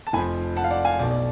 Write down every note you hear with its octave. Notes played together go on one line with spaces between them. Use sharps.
A5
F1 F2 F3 G#5 B5
F#5 A5
F5
D5 F#5
F5 G#5
B1 B2 D5
D5